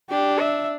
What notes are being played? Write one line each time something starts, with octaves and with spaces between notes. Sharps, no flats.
D4 G4
E5